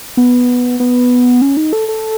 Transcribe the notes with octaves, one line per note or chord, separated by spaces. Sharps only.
B3
B3
C#4
D#4
A4
A4